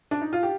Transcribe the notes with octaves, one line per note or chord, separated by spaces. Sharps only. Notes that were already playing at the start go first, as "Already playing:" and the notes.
D4
D#4
F4
G4